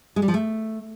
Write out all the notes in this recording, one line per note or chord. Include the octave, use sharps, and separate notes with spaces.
G#3
G3
F3
A3